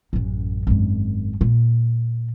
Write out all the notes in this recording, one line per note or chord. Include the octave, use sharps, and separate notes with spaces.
A1 F#2
G#1 F#2
A#2